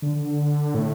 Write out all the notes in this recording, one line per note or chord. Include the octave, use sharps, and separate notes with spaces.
D3
A2